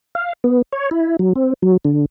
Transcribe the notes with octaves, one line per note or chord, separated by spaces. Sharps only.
F5
B3
C#5
E4
F#3
C4
F#3
D3